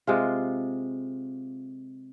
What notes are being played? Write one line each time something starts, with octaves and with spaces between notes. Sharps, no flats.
C3 G#3 F4